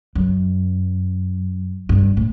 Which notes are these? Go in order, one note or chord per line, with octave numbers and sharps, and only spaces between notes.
F#2
G2
A2